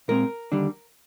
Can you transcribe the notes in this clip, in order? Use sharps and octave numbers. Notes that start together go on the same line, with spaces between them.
A#2 G#3 C4 A#4
D#2 D3 G3 D4